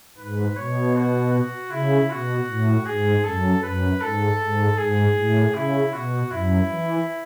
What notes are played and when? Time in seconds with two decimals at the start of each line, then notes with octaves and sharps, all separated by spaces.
0.18 G#2 B4
0.56 B2 C#5
0.95 F#4
1.33 F#4
1.71 C#3 E4
2.10 B2 F#4
2.47 A2
2.86 G#2 G#4
3.24 F#2 A4
3.63 F#2 B4
4.01 G#2 A4
4.39 G#2
4.77 G#2 G#4
5.16 A2
5.53 C#3 E4
5.92 B2 F#4
6.31 F#2 E4
6.69 E3